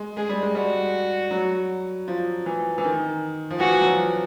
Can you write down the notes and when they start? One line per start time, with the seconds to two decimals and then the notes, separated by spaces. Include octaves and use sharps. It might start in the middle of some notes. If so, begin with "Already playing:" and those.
Already playing: G#3
0.17 G#3 G#4
0.29 G3
0.42 G#3
0.55 G3 F#4
1.31 F#3
2.08 F3
2.46 E3
2.78 E3
2.85 D#3
3.51 F3
3.60 E3 F#4
3.81 F#3
3.86 F3